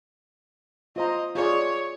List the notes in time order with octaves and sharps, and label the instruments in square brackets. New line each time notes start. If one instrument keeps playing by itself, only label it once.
[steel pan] F4 C5 A#5 [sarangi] D#5
[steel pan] F4 G#4 D5 [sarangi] C#5